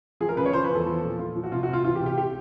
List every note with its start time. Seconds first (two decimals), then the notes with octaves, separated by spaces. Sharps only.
0.21 F3 G#4
0.29 A#4
0.37 C#3 B4
0.46 C#5
0.53 F3 C5
0.65 B4
0.70 E2
0.75 A4
0.86 F3
1.02 A#2
1.19 F3 F4
1.35 F3
1.43 F#4
1.52 C3 F4
1.63 F#4
1.68 C3
1.73 F4
1.84 E3 F4
1.96 G4
2.00 C3
2.06 G4
2.18 G4